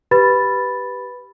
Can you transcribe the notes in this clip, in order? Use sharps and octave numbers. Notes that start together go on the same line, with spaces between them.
G4 B4 B5 A6